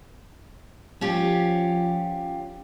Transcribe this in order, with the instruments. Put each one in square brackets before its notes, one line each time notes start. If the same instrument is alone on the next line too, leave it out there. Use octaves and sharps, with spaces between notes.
[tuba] F3 [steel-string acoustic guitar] C#4 F4 G4